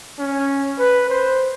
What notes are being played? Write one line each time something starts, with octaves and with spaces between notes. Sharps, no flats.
C#4
B4
C5